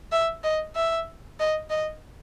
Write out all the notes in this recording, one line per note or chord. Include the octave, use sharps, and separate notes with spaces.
E5
D#5
E5
D#5
D#5